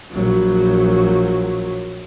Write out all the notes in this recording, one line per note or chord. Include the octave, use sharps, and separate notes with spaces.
A#1 F#3